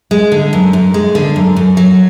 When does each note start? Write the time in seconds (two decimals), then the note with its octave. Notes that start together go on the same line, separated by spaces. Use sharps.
0.11 G#3
0.32 D3
0.53 F#2
0.73 F#2
0.94 G#3
1.15 D3
1.36 F#2
1.56 F#2
1.77 F#3